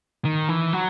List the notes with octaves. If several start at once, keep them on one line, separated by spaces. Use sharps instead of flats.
D#3
E3
F#3